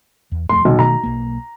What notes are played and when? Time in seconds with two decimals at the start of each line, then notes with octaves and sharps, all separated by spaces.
0.32 E2
0.49 D#1 F2 A3 C6
0.65 B1 C3 D#3 G3
0.79 B2 D#3 A3 A#5
1.03 B1 A#3